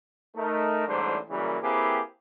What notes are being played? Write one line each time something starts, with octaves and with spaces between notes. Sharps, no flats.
A3 D#4 A#4
A1 G#2 D3 E3 G3 C5
F#2 C#3 E3 F#3 G3 A#3
A#3 C4 E4 G4 G#4 B4